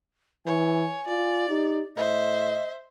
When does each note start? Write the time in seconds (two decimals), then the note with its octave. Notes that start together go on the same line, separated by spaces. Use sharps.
0.46 E3 C#5 G#5
1.07 F4 D5
1.49 D#4 G4
1.97 A2 C5 D#5 E5